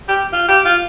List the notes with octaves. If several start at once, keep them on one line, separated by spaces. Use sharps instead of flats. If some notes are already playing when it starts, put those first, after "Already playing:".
G4
F4
G4
F4